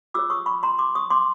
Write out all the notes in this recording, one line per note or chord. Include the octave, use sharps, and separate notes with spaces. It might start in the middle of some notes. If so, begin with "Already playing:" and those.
F4 G#4 C#5 D6 E6
C#6 D#6
B5 C#6
A#5 C6
C6 D6
C#6 D#6
C6 D6